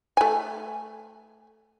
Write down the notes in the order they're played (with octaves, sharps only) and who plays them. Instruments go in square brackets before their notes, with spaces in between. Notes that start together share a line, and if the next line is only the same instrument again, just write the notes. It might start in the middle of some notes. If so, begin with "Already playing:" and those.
[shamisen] A3 G#5